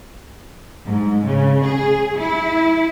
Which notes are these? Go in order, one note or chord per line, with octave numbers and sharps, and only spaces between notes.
G#2
C#3
G#4
E4